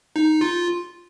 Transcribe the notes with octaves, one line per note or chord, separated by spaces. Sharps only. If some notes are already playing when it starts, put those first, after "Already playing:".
D#4
F4